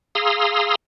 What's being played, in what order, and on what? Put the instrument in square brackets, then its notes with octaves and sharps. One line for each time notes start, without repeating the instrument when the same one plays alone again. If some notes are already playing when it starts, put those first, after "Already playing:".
[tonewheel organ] G#4 F5 A#5 C6 D#6 E6